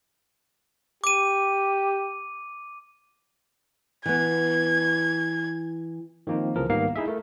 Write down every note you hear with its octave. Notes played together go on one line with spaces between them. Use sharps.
G4 D6 D#7
E3 B3 G#6
D#3 F3 A#3 C4 D#4
C2 C#3 E3 F3 A#4
G#2 D#3 G3 A#3 B3 F5
D#4 E4 G#4 E5
A3 A#4